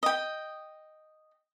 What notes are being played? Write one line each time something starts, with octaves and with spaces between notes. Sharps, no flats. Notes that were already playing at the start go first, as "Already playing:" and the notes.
D#5 G5